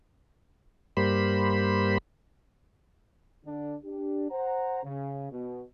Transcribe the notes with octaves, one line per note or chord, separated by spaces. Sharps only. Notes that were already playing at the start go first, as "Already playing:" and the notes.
G2 G3 A#3 C5 B5
D3 D4
D4 G4
C5 F#5 A#5
C#3
B2